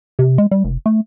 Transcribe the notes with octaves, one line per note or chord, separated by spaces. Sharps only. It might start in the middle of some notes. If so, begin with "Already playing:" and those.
C3
G#3
G3
F1
A3